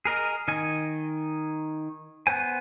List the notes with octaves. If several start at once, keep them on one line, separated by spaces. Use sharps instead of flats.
G#4 A#4 D#5
D#3 D#5 G#5
B3 C5 G#5